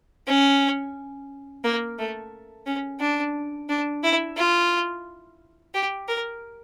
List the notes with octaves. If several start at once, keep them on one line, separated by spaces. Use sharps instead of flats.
C#4
A#3
A3
C#4
D4
D4
E4
F4
G4
A#4